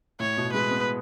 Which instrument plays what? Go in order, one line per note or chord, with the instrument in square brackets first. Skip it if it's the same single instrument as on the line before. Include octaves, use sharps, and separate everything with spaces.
[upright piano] A2 [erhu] C#5
[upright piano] B2
[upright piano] G#3 [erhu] B4
[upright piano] B3